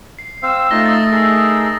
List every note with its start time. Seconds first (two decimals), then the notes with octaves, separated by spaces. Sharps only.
0.19 C7
0.43 C4 C5 F5 E6
0.71 A3 D#4 F4 A#6 G7
0.86 D#6 A6
1.12 D#4 G#4 A#4 E6